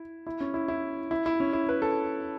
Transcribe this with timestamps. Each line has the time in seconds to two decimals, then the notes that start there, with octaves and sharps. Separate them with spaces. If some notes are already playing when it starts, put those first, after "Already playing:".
Already playing: E4
0.27 E4
0.41 C#4
0.54 E4
0.68 E4
1.11 E4
1.26 E4
1.40 C#4
1.53 E4
1.69 B4
1.82 A4